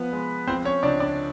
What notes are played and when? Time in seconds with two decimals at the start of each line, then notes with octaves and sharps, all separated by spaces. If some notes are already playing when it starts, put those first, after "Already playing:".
Already playing: F3 B3 B4
0.13 G#3
0.48 F3 C4 C5
0.65 C#4 C#5
0.83 C#2 D4 D5
1.00 D4 D5